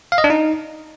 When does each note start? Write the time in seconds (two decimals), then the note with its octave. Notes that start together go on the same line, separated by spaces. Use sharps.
0.12 F5
0.18 D#5
0.24 D4
0.30 D#4